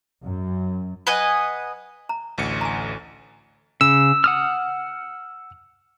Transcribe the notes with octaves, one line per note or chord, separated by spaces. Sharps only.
F#2
B4 D#5 F#5 G#5
A#5
A1 D2 C#7
G#5 A#5
C#3 E6
F#5 D#6 F6